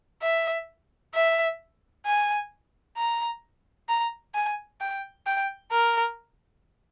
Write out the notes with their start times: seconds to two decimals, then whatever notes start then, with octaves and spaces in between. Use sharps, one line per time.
0.23 E5
1.14 E5
2.06 G#5
2.97 A#5
3.89 A#5
4.35 G#5
4.81 G5
5.26 G5
5.72 A#4